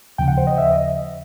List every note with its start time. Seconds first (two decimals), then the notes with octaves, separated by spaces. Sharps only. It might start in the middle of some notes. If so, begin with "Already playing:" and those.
0.18 D#2 C#3 F3 G5
0.28 F#5
0.37 C5
0.47 D#5
0.58 E5
0.71 D#5